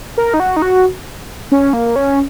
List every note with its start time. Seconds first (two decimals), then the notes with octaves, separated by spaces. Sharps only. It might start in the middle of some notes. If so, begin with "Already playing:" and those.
0.18 A#4
0.34 D#4
0.40 F#4
0.56 D#4
0.62 F#4
1.52 C#4
1.73 A#3
1.96 C#4